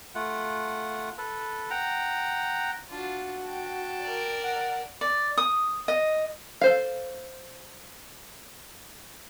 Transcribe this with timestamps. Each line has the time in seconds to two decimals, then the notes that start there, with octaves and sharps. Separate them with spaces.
0.15 A3 F4 F#5
1.18 A4 B4
1.70 F#5 G5 A#5
2.89 D4 F4 F#4
3.44 G5 A5
4.01 A#4 D5
4.44 F#5
5.01 D5
5.37 D#6
5.88 D#5
6.61 A4 C5 F5